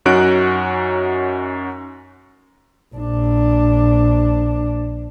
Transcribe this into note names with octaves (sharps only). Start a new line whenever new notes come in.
F#2 C#4 D#4 F#4 F#6 D7
A#1 D4